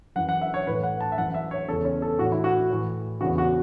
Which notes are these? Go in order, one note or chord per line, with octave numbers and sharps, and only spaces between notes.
F#2 E3 F#5
F#5
E5
C#5
A2 E3 B4
F#5
A5
E5
F#2 E3 F#5
E5
C#5
E2 C#3 E3 A4
C#4
A4
A2 E3 F#4
E4
F#4
A2 E3
E2 C#3 E3 F#4
F#4